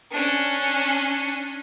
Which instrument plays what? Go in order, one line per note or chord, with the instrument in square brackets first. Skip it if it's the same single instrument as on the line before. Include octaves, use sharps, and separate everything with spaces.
[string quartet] C#4 D4